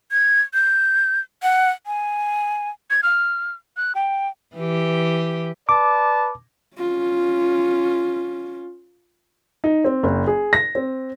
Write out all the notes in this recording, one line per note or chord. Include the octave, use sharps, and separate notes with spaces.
G#6
G6
F#5
G#5
G#6
F6
F#6
G5
E3 G4
B4 D5 A5 D6
C#4 F4
D#4
C4
F#1
G#4
A#6
C4